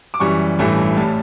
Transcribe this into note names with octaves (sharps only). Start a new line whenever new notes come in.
D6
F#2 E3 G3 C#6
A1 G2 E3 A3
A2 G3 A5